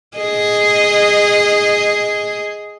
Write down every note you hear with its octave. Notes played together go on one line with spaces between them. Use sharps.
G#4 D#5